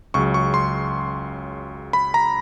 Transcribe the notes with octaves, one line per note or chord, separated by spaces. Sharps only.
C#2 C#3 F#3 C#6
C#6
C6
B5
A#5